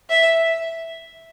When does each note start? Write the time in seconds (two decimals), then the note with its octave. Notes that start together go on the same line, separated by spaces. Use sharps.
0.10 E5